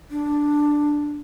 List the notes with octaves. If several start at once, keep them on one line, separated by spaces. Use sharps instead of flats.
D4